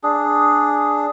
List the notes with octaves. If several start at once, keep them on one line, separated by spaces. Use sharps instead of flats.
D4 G#4